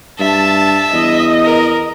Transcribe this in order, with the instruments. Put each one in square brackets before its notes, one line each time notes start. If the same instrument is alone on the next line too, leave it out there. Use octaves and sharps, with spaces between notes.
[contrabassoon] G2 [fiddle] E5 [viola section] A5
[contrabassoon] E2 [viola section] D#5
[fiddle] A#4